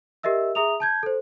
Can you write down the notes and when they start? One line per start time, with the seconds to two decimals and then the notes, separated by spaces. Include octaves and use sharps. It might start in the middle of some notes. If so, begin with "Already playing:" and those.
0.23 G4 A#4 D#5 E5 E6
0.55 G#4 E5 A#5 D#6 F7
0.80 A5 G6 G#6
1.03 A4 C5